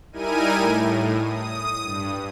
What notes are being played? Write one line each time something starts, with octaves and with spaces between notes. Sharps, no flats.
G3 D#4 E4 A#4 G#5 D#7
A2
D#6
G2